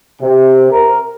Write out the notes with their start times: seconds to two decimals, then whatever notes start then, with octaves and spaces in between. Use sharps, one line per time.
0.22 C3
0.71 A#4